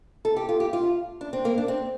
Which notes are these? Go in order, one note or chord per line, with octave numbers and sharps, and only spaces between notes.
A4
G4
F4
G4
F4
D4
C4
A#3
D4
C4